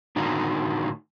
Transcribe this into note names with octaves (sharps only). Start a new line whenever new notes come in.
A2 D3 D#3 D#4 F#4